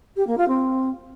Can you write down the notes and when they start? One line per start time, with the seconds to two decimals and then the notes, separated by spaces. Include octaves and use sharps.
0.16 G4
0.27 A#3
0.37 F4
0.48 C4